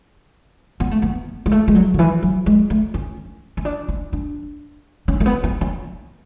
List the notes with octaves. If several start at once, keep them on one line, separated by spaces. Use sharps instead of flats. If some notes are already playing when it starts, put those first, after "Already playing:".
B3
A3
B3
G#3
A3
G#3
F#3
D3
E3
F#3
G#3
A3
C#4
C#4
D4
C#4
D4
C#4
A3
B3
B3
C#4